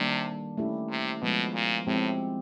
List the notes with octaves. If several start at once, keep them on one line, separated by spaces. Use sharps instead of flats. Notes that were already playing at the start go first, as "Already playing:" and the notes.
Already playing: C3 D#3 G3 A#3 D4
A3 C#4 E4 G4
C3
B2 F3 G#3 B3
A#2
A2 F3 G#3 C4 E4 G4